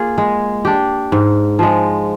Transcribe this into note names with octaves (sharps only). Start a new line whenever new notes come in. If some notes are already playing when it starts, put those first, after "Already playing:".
Already playing: A#3 F4 G#4
G#3
D4 G4
G#2
F3 G#3